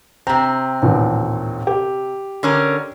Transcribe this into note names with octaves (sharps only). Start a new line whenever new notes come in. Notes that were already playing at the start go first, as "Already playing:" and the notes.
C3 C4 A#5
A1 D#2 A#2
G4
D3 C#4 A#4